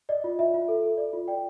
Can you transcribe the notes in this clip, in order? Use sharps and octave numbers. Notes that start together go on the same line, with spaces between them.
D5 D#5
F4
F4 E5
F4
A4
A4
D5
F4
D5 G5